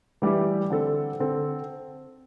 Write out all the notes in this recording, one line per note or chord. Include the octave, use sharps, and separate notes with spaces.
E3 G3 E4 G4
D3 C4 A4
D3 C4 A4